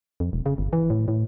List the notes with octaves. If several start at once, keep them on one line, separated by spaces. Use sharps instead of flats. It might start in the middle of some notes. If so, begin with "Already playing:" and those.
F2
E1
C#3
G1
E3
A2
A2